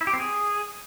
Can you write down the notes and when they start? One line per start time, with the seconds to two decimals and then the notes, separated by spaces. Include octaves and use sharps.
0.01 E4
0.07 G4
0.13 C4
0.20 G#4